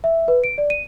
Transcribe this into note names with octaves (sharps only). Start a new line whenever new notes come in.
E5
B4
D7
D5
D#7